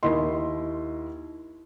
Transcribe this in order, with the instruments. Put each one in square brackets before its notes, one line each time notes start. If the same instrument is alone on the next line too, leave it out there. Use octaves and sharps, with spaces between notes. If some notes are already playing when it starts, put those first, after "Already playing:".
[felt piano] D#2 E4 D#5 C6